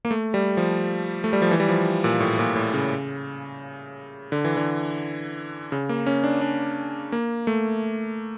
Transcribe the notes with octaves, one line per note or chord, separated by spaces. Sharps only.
A#3
A3
G3
F3
A3
G3
F3
E3
G3
F3
A#2
A2
A#2
A2
C#3
D3
E3
D3
C#3
A#3
C#4
D4
D4
A#3
A3